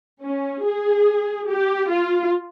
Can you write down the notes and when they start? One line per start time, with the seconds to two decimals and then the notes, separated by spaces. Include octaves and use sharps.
0.22 C#4
0.65 G#4
1.49 G4
1.90 F4